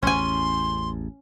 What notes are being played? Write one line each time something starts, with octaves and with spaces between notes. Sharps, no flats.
A1 E2 C#4 G#5 C6